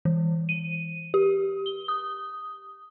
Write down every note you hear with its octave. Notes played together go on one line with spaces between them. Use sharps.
E3
D#7
G4
G7
D#6